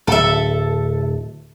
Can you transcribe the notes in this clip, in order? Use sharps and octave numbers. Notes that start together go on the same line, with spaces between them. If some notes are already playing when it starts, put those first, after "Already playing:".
D1 A4 E5